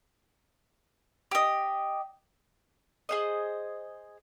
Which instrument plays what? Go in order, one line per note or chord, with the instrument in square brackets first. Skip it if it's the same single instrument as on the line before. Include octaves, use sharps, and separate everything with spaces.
[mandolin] G4 D#5
G#4 C5 D#5